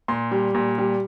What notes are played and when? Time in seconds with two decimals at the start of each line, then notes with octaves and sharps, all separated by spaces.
0.08 A#2 C6
0.31 G3
0.54 A#2
0.78 G3